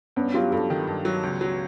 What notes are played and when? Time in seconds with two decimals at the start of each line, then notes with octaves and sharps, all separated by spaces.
0.16 G2 B3 C#4
0.34 F#3 F4 G4
0.51 G2 G4 A4
0.70 D#3
0.87 G2
1.05 F#3
1.23 C#2
1.41 F#3